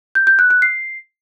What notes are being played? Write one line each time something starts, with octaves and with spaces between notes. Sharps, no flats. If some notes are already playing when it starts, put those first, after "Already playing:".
G6
G6
F#6
F#6
C7